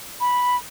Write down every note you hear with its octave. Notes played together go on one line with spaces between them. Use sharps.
B5